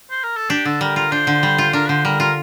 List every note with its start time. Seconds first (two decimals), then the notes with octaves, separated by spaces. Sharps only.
0.10 C5
0.24 A#4
0.37 A4
0.50 D4 G4
0.65 D3 A4
0.81 G3 A#4
0.96 F4 A#4
1.12 D4 C5
1.27 D3
1.43 G3
1.58 F4
1.73 D4 A#4
1.89 D3 C5
2.05 G3 A#4
2.20 F4 A#4